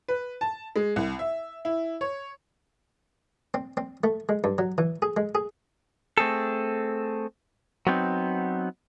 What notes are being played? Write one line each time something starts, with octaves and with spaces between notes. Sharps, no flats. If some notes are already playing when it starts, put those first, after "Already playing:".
B4
A5
G#3
C2
E5
E4
C#5
C4
C4
A3
G#3
G2
F#3
E3
G#4
G#3
G#4
A3 C4 G#4 A4
F#3 B3 C4 D#4